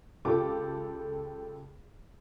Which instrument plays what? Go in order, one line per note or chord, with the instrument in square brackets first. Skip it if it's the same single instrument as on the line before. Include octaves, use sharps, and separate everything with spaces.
[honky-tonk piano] C#2 F4 G4 A4 D6